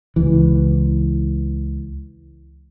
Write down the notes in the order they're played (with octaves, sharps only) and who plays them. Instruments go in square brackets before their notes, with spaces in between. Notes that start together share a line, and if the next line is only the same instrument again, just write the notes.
[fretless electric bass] C#2 E3